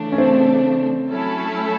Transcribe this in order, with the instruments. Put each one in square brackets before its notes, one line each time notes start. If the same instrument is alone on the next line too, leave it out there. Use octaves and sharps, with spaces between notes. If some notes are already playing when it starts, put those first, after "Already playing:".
Already playing: [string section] C#3 E3 A3 D4
[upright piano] C#4
C4
[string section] F#3 A3 C#4 E4 A4